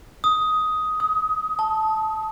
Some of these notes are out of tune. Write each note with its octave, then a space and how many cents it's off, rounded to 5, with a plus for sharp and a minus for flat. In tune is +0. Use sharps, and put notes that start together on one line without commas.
D#6 +10
D#6 +30
A5 -10